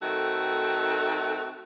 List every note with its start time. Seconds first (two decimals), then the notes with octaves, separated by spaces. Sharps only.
0.01 D#3 A3 C4 F#4 A4